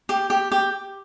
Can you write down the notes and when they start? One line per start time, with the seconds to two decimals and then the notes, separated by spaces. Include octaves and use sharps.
0.09 G4
0.30 G4
0.52 G4